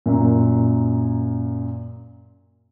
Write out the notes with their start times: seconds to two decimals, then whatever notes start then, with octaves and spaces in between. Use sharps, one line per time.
0.06 F#2 A#2